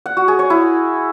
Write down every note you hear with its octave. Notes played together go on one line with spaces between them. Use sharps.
F#5
F#4
G#4
C#5
E4